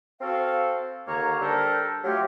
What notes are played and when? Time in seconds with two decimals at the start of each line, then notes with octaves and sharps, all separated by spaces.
0.21 C4 F#4 A4 F5
1.07 D#2 D3 A#3 C#5 A#5
1.41 G3 D4 A4 A#4 C5
2.03 F#3 A3 F4 G4